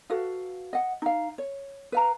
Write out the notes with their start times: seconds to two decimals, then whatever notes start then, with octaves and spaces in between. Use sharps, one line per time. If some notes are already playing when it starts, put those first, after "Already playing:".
0.10 F#4 A4 B4 F5
0.73 D#5 F#5
1.02 D#4 F5
1.38 C#5
1.92 B4 F5 A#5